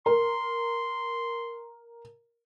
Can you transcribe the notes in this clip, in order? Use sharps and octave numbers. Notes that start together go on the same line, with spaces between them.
A#4 C6